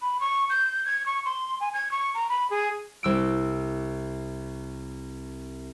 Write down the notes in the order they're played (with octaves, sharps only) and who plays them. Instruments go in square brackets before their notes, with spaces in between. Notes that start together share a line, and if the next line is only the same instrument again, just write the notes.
[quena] B5
C#6
G6
G#6
C#6
C6
G#5
G#6
C#6
A#5
B5
G#4
[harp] C2 E6 D7